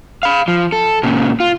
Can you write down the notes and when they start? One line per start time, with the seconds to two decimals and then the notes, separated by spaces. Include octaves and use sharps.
0.23 F5 B5
0.48 F3
0.72 A4
1.03 A#2 C#3
1.40 F4